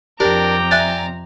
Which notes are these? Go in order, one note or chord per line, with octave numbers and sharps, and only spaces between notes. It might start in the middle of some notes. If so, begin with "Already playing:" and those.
F2 D4 G4 A#4 G5 A#5 D6
D5 E5 G#5 F#6 A6